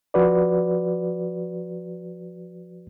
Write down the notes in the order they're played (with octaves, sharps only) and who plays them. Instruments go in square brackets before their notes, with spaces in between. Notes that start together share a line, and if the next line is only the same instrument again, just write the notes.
[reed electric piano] F3 F#4 B4 D5